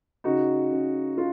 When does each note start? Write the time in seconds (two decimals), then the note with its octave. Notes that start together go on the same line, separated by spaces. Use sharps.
0.24 C#3 D#4 F#4
0.71 C#3
1.18 F4